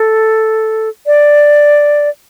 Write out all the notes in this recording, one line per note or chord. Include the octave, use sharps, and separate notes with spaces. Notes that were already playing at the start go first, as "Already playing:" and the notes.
Already playing: A4
D5